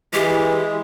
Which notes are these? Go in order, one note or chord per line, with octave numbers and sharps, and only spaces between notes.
E3 G#3 G4